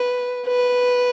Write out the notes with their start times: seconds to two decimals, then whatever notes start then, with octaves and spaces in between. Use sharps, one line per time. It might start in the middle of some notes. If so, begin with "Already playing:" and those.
Already playing: B4
0.47 B4